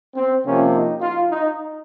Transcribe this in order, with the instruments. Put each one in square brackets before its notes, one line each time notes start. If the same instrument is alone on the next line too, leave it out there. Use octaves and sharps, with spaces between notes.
[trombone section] C4
C3 F3 A#3 C#4
D#4
F4
D#4